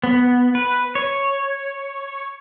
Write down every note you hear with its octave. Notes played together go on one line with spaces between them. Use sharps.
B3
B4
C#5